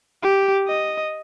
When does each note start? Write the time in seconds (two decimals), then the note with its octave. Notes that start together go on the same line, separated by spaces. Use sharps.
0.23 G4
0.68 D#5